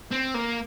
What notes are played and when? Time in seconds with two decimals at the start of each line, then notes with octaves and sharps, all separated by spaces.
0.11 C4
0.35 A#3